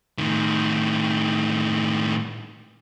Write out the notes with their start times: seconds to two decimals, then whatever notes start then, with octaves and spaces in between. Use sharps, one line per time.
0.18 A2 D#3